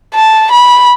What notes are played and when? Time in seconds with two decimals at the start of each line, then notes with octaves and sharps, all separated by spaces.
0.14 A5
0.52 B5